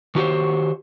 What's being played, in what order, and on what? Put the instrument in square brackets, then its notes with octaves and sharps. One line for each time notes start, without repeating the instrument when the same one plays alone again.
[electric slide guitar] D#3 F#4 G4 C5 C#5